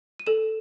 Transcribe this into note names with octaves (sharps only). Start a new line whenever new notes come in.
D#7
A4 E7